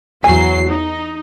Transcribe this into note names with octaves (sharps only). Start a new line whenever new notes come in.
E2 F#3 G#5 C7
D#4